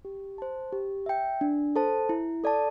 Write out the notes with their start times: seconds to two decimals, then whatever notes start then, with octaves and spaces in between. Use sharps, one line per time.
0.05 G4
0.38 C5 A5
0.72 G4
1.06 E5 G5
1.41 D4
1.76 A4 C5 A5
2.09 E4
2.44 A4 D5 A5